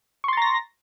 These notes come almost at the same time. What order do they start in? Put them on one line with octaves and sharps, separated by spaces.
C#6 C6 A6 A#5 A#6